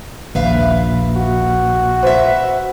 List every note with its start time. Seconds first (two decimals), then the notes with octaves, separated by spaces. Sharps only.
0.35 A#1 D#2 B4 E5 F5
1.16 F#4
2.03 B4 C5 E5